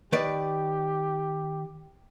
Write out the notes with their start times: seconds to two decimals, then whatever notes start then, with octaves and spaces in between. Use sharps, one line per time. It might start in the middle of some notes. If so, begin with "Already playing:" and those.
0.12 D#3 G4 B4 D5